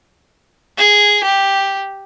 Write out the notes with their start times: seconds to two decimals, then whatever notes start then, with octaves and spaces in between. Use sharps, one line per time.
0.78 G#4
1.24 G4